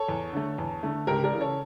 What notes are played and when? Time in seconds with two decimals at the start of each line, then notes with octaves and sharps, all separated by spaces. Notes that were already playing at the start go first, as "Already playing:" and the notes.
Already playing: A4 C#5
0.08 E2
0.33 D3 A3
0.58 E2
0.83 D3 A3
1.07 C#2 G4 A#4
1.24 A#4 D5
1.33 C#3 E3
1.41 A4 C#5